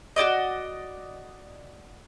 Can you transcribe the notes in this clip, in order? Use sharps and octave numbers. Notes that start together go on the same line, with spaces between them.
F#4 G4 D5 D#5